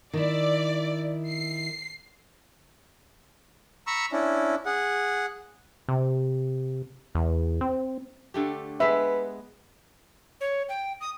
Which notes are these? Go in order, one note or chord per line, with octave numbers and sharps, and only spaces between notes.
D#3 E4 D5
C7
A#5 B5 C#6 E6
C#4 D4 E4
G#4 F#5
C3
E2
C4
D3 A3 G4
G#3 B3 B4 E5
C#5
G5
D#6